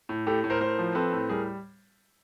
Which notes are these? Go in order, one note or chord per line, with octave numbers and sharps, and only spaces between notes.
A2
A2 G4 A4
A2
A#4 C5
A2 A#4 C5
F3
C4 A4 B4
A2
G3 G#4 A#4